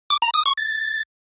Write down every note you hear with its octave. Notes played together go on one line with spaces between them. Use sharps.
D6
A#5
D#6
C#6
A6